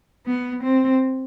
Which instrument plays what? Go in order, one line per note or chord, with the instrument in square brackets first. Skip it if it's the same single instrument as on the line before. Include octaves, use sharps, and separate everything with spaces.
[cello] B3
C4